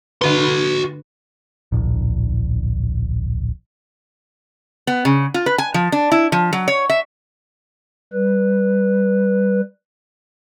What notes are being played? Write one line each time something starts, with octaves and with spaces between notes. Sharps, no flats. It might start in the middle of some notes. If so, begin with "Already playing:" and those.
D3 F#4 B4 C6
D1 A#1
B3
C#3
F4
B4
G#5
F3
D4
E4
F3
F#3
C#5
E5
G3 B4